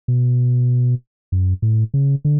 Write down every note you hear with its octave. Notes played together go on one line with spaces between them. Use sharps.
B2
F#2
A2
C#3
D3